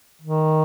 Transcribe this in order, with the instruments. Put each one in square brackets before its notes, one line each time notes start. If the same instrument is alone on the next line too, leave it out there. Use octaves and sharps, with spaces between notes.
[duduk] D#3